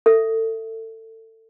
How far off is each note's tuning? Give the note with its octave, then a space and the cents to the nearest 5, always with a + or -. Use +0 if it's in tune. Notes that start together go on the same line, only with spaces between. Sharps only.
A4 +25 E5 +0